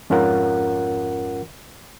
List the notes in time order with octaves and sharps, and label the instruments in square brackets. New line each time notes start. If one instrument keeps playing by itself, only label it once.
[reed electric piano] F2 G#2 C#4 F4 A#4 F#5